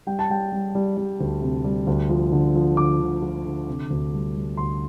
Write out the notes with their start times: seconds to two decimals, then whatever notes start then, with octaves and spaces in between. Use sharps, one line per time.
0.07 G3 G5
0.19 A5
0.30 G3 G5
0.52 G3
0.75 G3
0.97 G3
1.20 D2
1.42 C3
1.64 G3
1.87 D2
2.10 F3
2.32 D3
2.56 F3
2.77 D3 D6
3.00 D3
3.22 F3
3.45 D3
3.68 C3
3.90 D2
4.13 G3
4.35 G3
4.57 D2 C6